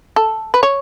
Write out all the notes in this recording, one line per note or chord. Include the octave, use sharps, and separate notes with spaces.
A4
B4
C#5